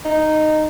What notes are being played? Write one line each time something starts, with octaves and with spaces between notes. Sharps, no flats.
D#4